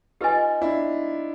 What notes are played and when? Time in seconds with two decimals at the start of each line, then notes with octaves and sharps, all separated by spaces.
0.21 D#4 F4 G4 B4 D#5 G#5
0.61 D4 E4